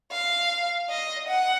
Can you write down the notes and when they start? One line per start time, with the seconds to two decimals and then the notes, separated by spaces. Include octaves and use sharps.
0.12 F5
0.90 D#5
1.29 F#5